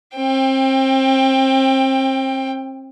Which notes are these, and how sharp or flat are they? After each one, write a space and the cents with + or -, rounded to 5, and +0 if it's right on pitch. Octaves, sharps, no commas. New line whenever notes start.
C4 +35 G5 +20